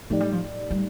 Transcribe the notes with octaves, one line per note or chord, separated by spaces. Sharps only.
A2 F3 A3 D#4 G4 D5
G3
F3
G3